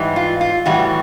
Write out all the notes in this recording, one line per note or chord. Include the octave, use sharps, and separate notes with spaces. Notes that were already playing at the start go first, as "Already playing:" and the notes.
Already playing: G#2 E3 G3
F4
F4
A2 E3 G3 F#4